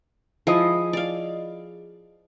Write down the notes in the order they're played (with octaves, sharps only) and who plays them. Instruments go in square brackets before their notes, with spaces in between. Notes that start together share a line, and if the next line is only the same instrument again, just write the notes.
[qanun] F3 E4 [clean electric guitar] G#4 D#5
[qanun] D5 F5